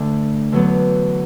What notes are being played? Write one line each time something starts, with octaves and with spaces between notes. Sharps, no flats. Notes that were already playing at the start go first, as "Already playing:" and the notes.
Already playing: D2 D3 A3
E2 D3 F#3 B3